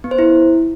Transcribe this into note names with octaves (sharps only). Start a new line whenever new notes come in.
B3
C5
E4